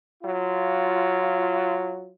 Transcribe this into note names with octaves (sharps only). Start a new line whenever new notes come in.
F#3 F4